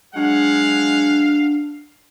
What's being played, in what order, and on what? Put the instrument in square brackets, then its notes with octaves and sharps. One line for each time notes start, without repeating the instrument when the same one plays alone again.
[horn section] F#3 G#3 F#5 [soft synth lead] D4 [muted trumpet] F5